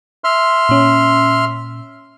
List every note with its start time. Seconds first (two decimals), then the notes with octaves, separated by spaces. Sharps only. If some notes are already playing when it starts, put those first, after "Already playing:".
0.24 E5 C6 F6
0.69 A#2 C#4